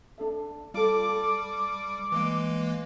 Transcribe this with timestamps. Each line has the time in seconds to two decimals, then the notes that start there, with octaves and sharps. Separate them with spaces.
0.18 D4 A4 E5
0.74 G3 F4 A4 D6
1.09 A4
2.12 E3 G#3 A#3